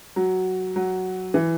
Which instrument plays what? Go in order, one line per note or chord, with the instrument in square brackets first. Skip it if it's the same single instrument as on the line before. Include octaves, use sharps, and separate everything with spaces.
[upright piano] F#3
F#3
E3